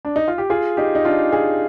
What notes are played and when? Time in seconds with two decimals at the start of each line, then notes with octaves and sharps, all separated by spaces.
0.05 D4
0.16 D#4
0.28 F4
0.38 G4
0.50 F4 G#4
0.77 D#4 G4
0.95 D#4
1.05 D4 F4
1.32 F4 G#4